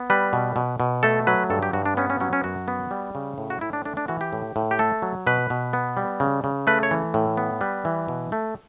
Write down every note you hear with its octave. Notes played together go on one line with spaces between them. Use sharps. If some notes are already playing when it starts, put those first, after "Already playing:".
Already playing: B3
G3 B4
B2
B2
B2
A3 A4
F#3 B4
G2 A4
G4
G2 F#4
D4
B3 C#4
C#4
F#3 C#4
C#4
F#2 F#4
B3
G3
C#3
A2
F#4
A2 E4
D4
A3 D4
D4
E3 F#4
G4
A2
A2
G4
A3 A4
F#3
B2 B4
B2
B3
G3
C#3
C#3
A3 B4
C#5
E3
A2
B3
G3 B4
E3
B2
A3